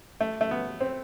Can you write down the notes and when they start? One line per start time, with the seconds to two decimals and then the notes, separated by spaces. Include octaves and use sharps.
0.21 A3
0.41 A3
0.51 B3
0.81 C4